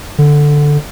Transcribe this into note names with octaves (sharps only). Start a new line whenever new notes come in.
D3